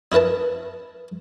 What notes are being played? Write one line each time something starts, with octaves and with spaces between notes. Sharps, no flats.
D#4 E4 A#4 B4 A5